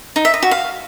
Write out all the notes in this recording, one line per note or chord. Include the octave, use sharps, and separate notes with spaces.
D#4
E5
D#5
F#4
F5